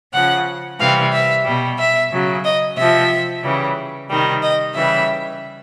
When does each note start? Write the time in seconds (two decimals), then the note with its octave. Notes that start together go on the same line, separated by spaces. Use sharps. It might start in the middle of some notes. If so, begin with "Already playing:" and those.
0.14 C#3 F3 F#5
0.79 C3 E3 G3 F5
1.12 E5
1.45 B2 G3
1.79 E5
2.11 C#3 F#3
2.44 D#5
2.77 C3 F3 E5
3.43 C#3 E3 G3
4.09 C3 D#3 G3
4.42 D#5
4.74 C#3 E3 G3 E5